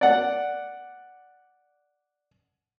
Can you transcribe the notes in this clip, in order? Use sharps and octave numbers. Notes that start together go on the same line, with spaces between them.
D5 F#5